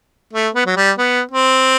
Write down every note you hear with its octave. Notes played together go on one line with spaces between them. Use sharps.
A3
B3
F#3
G3
B3
C4